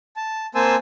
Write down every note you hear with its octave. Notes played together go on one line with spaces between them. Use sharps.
A5
A#3 C4 C5 G#5 A5 E6